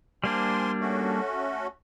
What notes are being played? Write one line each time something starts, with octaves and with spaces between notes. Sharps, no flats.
G3 A#3 D4 C5 G#5 C6
A3 C#4 F#4